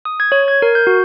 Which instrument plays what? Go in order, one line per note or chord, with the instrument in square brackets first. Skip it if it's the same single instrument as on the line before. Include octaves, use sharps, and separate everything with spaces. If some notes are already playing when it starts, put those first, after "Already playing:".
[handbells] D#6
G#6
C#5
G#6
A#4
G6
F#4